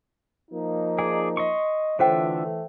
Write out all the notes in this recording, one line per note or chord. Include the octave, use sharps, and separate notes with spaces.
F3 A#3 D#4
G#4 D5 G#5
D#5 C6 C#6
D3 E3 A3 F4 C5 C#5 E5 G5